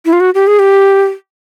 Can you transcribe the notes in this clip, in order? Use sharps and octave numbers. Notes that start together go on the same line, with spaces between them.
E4
F4
F#4
G4
G#4
G4